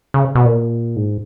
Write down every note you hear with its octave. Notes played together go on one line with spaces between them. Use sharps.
C#3
B2
A#2
G#2